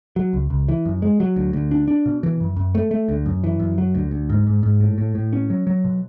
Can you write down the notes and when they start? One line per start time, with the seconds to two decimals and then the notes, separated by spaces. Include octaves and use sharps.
0.16 F#3
0.33 C#2
0.50 C#2
0.68 E3
0.86 F#2
1.02 G#3
1.20 F#3
1.36 D2
1.53 D2
1.71 D4
1.88 D4
2.06 B2
2.23 E3
2.40 F#2
2.56 F#2
2.75 A3
2.91 A3
3.08 D2
3.26 F#2
3.44 E3
3.60 F#2
3.78 F#3
3.95 D2
4.11 D2
4.30 G#2
4.47 G#2
4.63 G#2
4.80 A2
4.98 A2
5.15 A2
5.33 C#4
5.50 F#3
5.67 F#3
5.84 B2